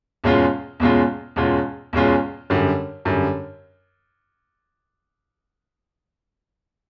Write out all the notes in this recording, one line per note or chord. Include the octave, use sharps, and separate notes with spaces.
E2 B2 G#3 C#4 F4
E2 B2 G#3 C#4 F4
E2 B2 G#3 C#4 F4
E2 B2 G#3 C#4 F4
F#2 D3 G3
F#2 D3 G3